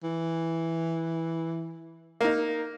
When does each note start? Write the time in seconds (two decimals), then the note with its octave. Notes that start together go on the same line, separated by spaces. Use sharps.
0.03 E3
2.21 A#3 D#4